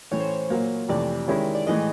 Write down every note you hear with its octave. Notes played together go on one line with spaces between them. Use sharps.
A2 E3 A3 C#4 C#5
C5
C#5
A#2 F#3 A#3
F2 C3 E3 A3 D5
D#3 G#3 C#4 E4 G4
D5
A2 E3 G#3 D#5